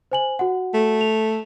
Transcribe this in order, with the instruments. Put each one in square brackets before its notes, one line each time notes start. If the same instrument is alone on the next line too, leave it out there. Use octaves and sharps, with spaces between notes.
[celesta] C5 G#5 F#7
F#4 F#5
[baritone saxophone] A3
[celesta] F7